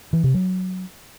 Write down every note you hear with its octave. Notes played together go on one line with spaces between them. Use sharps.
E3
C3
F#3